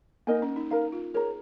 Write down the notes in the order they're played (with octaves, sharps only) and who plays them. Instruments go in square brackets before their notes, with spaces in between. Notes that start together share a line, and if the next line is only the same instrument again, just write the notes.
[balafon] A#3 [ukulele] D#4 A#4 D#5 G#5
[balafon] C#4
D#4
[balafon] D#4 [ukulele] A#4 F5 A#5
[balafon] F4
[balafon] G#4 [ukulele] A#4 C#5 A#5